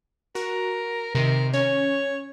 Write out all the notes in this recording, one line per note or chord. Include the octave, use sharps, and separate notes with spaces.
F#4 A#4
C3 D#3 A#4
C#4 C#5